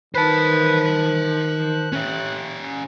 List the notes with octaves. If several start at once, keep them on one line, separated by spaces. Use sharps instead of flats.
D#3 B4 C5 A5
F#6
C#4 G4